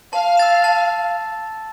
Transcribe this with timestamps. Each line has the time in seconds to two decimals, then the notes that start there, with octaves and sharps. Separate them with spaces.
0.13 F5 A5
0.37 E6 A6 E7
0.64 A5